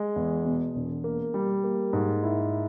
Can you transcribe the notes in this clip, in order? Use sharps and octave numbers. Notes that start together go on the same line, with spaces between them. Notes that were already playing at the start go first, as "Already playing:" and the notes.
Already playing: G#3
E2
B2
E1
A#3
G3
A#3
G#2
E4